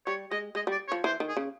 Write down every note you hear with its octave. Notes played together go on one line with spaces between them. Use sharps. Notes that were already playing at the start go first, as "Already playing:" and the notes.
G3 C#5
G#3 D#5
G#3 D#5
G3
D5
C#5
F3
E3 C5
D#3
G#4
C#3